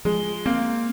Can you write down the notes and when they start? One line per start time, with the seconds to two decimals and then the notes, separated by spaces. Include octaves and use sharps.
0.05 F3 G#3
0.46 A#3 C4